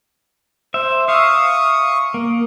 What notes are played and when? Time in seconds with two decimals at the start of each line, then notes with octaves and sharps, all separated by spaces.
0.74 C5 E5
1.08 E5 F5 C#6 D#6
2.14 A#3